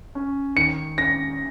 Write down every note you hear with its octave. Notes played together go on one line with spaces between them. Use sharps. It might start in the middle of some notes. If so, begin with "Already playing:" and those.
C#4
D#3 C#7
C#4 A#6